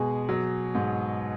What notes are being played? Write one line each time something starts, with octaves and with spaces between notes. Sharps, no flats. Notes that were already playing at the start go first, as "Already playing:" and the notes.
Already playing: B2 G#3 G#4
F#3
G#2